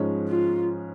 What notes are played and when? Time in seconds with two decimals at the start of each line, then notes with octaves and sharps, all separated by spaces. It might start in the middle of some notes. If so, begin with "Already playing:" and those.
Already playing: G#2 F3 G#3 C#4
0.28 F4